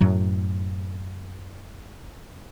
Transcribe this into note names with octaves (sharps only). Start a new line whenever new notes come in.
F#2 A2 F#3